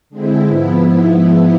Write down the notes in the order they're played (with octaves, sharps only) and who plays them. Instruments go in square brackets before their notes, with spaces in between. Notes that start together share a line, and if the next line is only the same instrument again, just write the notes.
[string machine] D3 G#3 C4 E4
G#2 F3 B3 E4